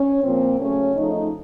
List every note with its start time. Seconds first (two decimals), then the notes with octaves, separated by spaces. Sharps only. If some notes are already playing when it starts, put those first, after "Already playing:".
Already playing: C#4
0.24 A#2 F3 A#3 C4
0.60 C#3 F#3 A3 C#4
0.96 C#3 F3 A3 D#4